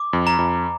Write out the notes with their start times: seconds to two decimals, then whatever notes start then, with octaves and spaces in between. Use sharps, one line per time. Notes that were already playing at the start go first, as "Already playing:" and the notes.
Already playing: D6
0.13 F2
0.27 A#5
0.39 F2